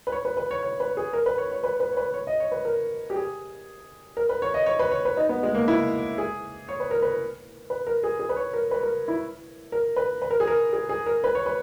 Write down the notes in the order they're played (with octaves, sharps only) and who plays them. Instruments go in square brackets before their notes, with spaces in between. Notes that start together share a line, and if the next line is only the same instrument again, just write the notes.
[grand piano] B4
C#5
B4
B4
C#5
C#5
B4
G#4
A#4
B4
C#5
C#5
B4
B4
C#5
B4
C#5
D#5
C#5
B4
A#4
G4
G#4
A#4
B4
C#5
D#5
C#5
B4
C#5
B4
D#4
B3
G#3
A#3
E4
G#4
C#5
B4
A#4
B4
B4
A#4
G#4
G#4
B4
C#5
A#4
B4
A#4
E4
A#4
B4
B4
A#4
G#4
A#4
G#4
G#4
A#4
B4
C#5
B4